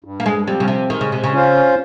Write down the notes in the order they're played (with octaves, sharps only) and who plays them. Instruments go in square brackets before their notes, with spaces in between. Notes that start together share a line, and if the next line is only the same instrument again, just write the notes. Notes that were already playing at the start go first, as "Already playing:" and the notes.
[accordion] G2
[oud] A#3
G#3
[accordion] F3 C4 [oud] G3
[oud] C#3
C3
[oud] D#3 [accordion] G#3
[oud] C#3
C3
C#3
[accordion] C#4 F4 C5